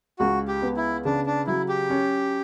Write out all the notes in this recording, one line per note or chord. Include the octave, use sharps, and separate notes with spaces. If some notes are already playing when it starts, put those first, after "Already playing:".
C#2 F#4
G4
B3
E4
C#3 D4
D4
F#3 E4
G4
C#4